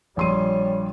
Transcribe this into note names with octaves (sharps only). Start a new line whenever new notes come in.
A#1 G3 C#5 C6 D#7